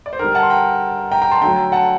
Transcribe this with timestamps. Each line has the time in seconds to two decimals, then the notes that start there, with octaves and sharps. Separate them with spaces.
0.06 D5
0.13 C5
0.19 D3 G3 A#4
0.35 F#5 A5
0.43 C6
0.50 G5 A#5
1.11 G5 A#5
1.21 G5 A#5
1.31 A5 C6
1.42 D3 F#3 A3 G5 A#5
1.72 F#5 A5